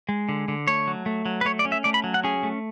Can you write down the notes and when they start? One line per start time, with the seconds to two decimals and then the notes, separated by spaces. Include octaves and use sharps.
0.09 G#3
0.29 D3
0.48 D3
0.67 A3 C#5
0.87 F#3
1.06 A3
1.26 F#3
1.41 B4
1.45 A3 C#5
1.59 D5
1.65 C#4
1.72 E5
1.84 A3 D5
1.94 B5
2.04 F#3
2.14 F#5
2.24 C#4 G#4
2.43 A3